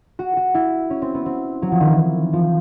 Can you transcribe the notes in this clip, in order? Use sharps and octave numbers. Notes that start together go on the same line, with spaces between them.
F#4
F#4
E4
C#4
C4
B3
C4
F#3
F3
D#3
E3
F3